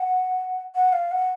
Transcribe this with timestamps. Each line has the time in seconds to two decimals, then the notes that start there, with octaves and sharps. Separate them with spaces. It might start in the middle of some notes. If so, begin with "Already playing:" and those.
Already playing: F#5
0.75 F#5
0.92 F5
1.11 F#5